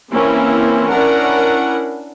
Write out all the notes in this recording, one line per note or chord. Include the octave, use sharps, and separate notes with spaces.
E3 A#3 C4 C#4 E4
C#4 D4 E4 A#4 F#5